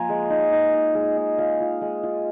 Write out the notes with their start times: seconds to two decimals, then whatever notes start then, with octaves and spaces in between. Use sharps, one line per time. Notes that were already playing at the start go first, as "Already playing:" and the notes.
Already playing: F3 A#3 F4 G#5 A#5
0.09 G#3
0.30 D#4
0.52 D#4
0.74 D#4
0.95 G#3
1.17 D#4
1.38 F4 F5
1.60 F4
1.81 G#3
2.03 F4